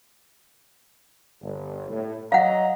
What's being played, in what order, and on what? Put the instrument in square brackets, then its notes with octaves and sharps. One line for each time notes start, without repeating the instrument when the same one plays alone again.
[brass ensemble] G1
A2
[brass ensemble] F#3 D#5 A#5 [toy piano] F5 F#5